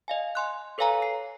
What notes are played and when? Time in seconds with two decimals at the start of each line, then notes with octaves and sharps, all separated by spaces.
0.08 D#5 F5 G#5
0.35 G#5 C6 F#6
0.78 A4 B4 C#5 F5 G#5 A#5
1.02 C7